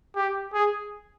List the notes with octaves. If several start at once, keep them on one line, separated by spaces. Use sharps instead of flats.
G4
G#4